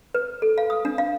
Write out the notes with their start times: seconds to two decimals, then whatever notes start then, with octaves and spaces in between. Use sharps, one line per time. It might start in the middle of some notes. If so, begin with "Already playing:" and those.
0.14 B4
0.42 A4
0.58 F5
0.70 D#6
0.85 D4
0.98 F5